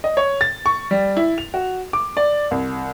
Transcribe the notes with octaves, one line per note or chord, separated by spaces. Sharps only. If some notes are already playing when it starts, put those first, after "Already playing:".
D#5
C#5
A6
C#6
G3
E4
F7
F#4
D6
D5
C2